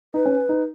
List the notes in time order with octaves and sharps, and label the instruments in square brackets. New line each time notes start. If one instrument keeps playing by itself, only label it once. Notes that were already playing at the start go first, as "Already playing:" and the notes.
[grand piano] D#4 [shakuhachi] B4
[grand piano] C#4
D#4